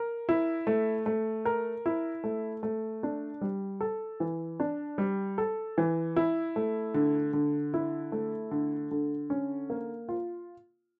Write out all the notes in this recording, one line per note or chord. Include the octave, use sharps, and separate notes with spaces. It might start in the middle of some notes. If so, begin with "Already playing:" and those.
Already playing: A#4
E4
A3
A3
A#4
E4
A3
A3
D4
G3
A4
E3
D4
G3
A4
E3
E4
A3
D3
D3
E4
A3
D3
D3
C#4
A#3
F4